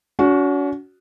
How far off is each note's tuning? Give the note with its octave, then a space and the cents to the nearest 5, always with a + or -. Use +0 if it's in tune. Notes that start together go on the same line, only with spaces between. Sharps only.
C#4 +45 F#4 +0